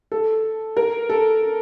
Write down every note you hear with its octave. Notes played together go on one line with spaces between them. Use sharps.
A4
A#4
A4